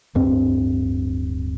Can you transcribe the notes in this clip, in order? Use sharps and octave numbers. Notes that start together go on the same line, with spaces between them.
D1 G2 C4